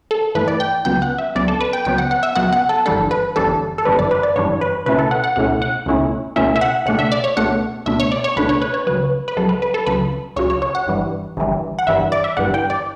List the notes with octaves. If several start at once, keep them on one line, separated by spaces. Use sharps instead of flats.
A4
G2 E3 A3 B4
D5
G5
C#2 C#3 F#3 B3 G5
F#5
E5
C#2 C#3 F#3 B3 D5
A4
B4
G5
C#2 C#3 F#3 B3 G5
F#5
F#5
E5
C#2 C#3 F#3 B3 F#5
F#5
A4
G1 F#2 E3 G3 D4 A4
B4
G1 F#2 E3 G3 D4 A4
A4
G1 F#2 E3 G3 D4 B4
D5
B4
D5
G1 F#2 E3 G3 D4 C#5
B4
C#2 B2 A3 C#4 E4 B4
A4
F#5
F#5
C#2 B2 A3 C#4 E4 F#5
F#5
C#2 B2 A3 C#4 E4
C#2 B2 A3 C#4 E4 E5
E5
F#5
C#2 B2 A3 D4 F#5
E5
D5
C#5
C#2 B2 A3 D4 F#5
C#2 B2 A3 D4 E5
C#5
D5
C#5
C#2 B2 A3 D4 B4
C#5
B4
C#5
C#2 C#3 F#3 B4
B4
C#2 C#3 F#3 A4
B4
B4
A4
C#2 C#3 F#3 B4
C#2 C#3 F#3 C#5
C#5
C#5
F#5
G1 G2 E3 G3
G1 G2 E3 G3
F#5
G1 G2 E3 G3 E5
D5
E5
G1 G2 E3 G3 F#5
G5
D5